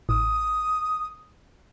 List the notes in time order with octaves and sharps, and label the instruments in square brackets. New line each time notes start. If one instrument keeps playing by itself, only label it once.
[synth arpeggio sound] A1 [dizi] D#6